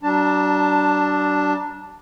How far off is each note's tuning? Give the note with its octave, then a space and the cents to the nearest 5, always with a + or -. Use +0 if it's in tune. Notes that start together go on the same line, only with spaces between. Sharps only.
F#3 +45 D4 +0 A5 +20